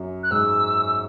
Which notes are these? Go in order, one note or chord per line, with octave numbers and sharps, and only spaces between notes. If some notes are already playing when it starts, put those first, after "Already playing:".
Already playing: F#2
F#6
G#2 E6